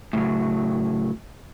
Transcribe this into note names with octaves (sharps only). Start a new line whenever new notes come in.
A2 C#3 F#3